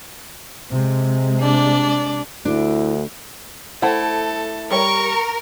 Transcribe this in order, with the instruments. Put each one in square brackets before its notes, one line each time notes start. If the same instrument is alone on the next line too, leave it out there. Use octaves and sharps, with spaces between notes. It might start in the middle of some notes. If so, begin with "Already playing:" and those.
[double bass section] C3 G#3
[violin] D4 D5
[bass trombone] D2 [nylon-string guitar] D4 [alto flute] E4
[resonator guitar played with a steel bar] A3 E4 A5 [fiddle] A4 [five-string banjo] C5 F#5
[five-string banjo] G3 G4 C#5 [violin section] A#4 [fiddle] C#6